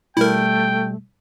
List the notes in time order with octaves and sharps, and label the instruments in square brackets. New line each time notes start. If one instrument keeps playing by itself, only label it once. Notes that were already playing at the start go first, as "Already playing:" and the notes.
[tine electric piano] B2 G3 [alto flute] A3 [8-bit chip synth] E4 A#4 [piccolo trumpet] G5